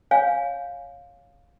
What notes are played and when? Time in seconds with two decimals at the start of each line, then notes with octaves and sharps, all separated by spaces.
0.11 C#5 F5 G#5